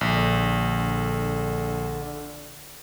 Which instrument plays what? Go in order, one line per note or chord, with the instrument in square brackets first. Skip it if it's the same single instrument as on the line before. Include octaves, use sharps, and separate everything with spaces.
[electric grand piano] A#1 [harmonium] D3